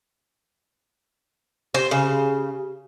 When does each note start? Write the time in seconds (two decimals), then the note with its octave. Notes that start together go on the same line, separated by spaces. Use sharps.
1.74 G4 C5
1.91 C#3